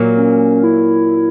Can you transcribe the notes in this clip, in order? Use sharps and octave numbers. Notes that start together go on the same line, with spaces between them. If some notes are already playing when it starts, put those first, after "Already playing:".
Already playing: A#2 F#3 A#3
C#4
E4